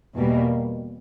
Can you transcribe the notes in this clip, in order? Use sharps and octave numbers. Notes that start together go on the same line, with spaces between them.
E2 B2 G3 A#3